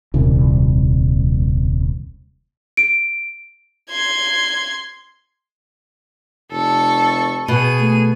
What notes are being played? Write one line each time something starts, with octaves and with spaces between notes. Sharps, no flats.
D#1 C2
D7
C6 G#6
F1 A4 C#6
B2 G#4 D#7
A3